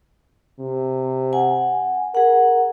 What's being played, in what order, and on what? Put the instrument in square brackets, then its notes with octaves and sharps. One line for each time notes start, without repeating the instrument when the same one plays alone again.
[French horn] C3
[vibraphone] F#5 G#5
[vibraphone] G#4 F#5 [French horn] A#4